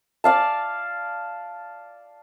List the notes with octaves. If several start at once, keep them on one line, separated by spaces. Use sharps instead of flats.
D5 F5 A5